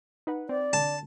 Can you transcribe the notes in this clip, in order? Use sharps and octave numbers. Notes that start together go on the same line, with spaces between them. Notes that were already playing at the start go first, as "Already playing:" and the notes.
D#4 B4 F#5
C4 D5
D3 A5